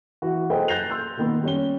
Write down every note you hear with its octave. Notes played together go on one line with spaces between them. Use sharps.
E3 F#4
G#4 A4 B4 C5 D#5 G5
F#6 G6 A6 A#6 C7 F7
C6 E6 G6
A#2 D#3 B3
G3 C#4 G7